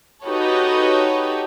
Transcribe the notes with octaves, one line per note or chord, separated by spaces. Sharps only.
D#4 F#4 G4 A4 B4 C#5